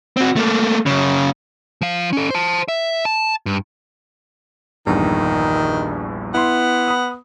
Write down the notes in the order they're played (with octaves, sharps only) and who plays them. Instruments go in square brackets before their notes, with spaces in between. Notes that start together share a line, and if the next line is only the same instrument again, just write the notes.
[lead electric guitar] C4 F#4
A3 A#3
F#2 C#3
F3 F5
C#4 A4
C5 A5
E5
A5
G2
[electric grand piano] A#1 E2 G2 [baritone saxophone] D#3
[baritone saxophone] B3 [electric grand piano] E4 C6
[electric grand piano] B5 D#6